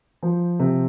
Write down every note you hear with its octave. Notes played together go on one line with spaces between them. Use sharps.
F3
C3